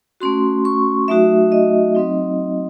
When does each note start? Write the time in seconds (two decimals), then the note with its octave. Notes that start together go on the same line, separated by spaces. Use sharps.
0.21 A3 C#4 F#4 C6
0.65 C#6
1.08 F#3 A3 D#4 F#4 E5
1.52 D#5
1.95 F#3 C4 D#4